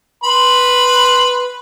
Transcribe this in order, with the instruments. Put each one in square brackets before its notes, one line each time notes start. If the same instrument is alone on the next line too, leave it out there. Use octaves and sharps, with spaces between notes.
[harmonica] B4 B5 C6